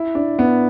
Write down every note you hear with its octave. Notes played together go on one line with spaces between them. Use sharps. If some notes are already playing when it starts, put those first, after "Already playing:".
Already playing: E4
D4
B3